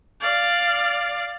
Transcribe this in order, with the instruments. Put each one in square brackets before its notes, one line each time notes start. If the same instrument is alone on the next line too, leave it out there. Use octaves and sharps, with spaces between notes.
[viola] D5 F5